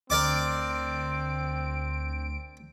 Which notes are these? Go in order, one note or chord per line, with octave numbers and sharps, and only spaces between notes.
D2 C4 A#4 D5 D6 D7